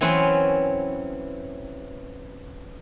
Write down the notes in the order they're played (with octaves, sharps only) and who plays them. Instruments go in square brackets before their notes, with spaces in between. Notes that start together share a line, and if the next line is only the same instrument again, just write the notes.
[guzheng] E3 F#3 C4 C#4 B4 C#5